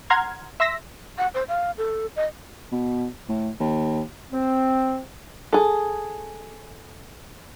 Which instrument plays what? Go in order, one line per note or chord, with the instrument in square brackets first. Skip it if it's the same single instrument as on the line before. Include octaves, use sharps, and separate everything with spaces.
[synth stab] F#5 A#5 C6 F6 G#6
E5 C6 E6 A#6 B6
[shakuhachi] F#5
C5
F5
A4
D#5
[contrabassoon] B2
A2
D#2
[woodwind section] C4
[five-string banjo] G#4 A4